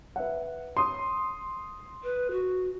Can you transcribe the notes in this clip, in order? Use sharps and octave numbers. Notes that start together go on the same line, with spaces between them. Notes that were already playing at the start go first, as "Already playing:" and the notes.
B4 E5 F#5
C6 D#6
B4
F#4